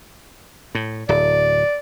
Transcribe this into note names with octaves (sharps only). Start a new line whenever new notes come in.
A2
D1 D5